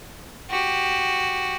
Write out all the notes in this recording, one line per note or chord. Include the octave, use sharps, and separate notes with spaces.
F#4 G4